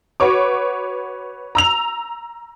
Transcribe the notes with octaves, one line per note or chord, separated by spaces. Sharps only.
F#4 B4 C#5 D6
A#5 E6 F7